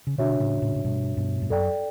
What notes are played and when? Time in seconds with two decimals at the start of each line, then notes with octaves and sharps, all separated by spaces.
0.07 C#3
0.18 B2 D3 D4 F#4 C#5 E5
0.40 A2 C#3
0.62 A2 C#3
0.76 A2
0.84 G2 B2
1.17 G2 B2
1.42 G2
1.50 F#2 A4 D5 G5